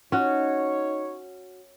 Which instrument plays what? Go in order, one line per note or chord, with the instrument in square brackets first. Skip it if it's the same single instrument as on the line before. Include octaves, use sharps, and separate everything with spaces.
[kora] C#4 F#4 [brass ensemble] D#4 C#5